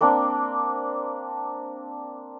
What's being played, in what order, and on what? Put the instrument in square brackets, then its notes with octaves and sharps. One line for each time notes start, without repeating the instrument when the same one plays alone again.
[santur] A#3 C4 D4